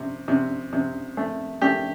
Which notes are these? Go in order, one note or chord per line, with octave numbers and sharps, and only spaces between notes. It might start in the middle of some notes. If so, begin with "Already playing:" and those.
Already playing: C3
C3
C3
A3
A3 G4